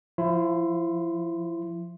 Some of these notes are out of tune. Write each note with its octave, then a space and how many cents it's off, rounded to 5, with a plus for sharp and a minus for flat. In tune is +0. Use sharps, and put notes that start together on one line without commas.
F3 +5 E4 +25 C6 +0